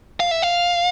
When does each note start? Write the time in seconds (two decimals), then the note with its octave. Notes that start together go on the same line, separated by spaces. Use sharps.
0.20 F5
0.31 E5
0.42 F5